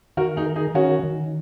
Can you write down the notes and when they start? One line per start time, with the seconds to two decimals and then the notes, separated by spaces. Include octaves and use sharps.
0.17 D#3 F#4 A#4
0.36 D#4 G#4
0.46 A#4
0.56 D#4 G#4
0.74 D#3 C#4 F#4
1.03 D#3